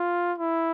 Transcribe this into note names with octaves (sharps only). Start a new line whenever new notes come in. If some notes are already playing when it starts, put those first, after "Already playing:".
Already playing: F4
E4